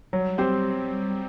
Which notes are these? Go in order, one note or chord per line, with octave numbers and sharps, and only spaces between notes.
F#3 G3
C4 G4 C5